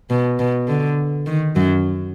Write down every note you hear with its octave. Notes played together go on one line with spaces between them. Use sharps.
B2
B2
D3
D#3
F#2 F#3